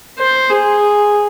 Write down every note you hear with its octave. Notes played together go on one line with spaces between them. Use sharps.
C5
G#4